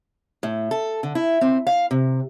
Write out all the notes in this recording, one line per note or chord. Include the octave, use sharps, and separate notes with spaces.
A2
A4
D3
E4
C4
F5
C3